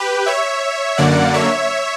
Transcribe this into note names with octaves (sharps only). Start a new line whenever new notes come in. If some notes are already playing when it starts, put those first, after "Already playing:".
Already playing: G4 B4
C#5 E5
F#2 D3 A#3 D5 F#5
C#5 E5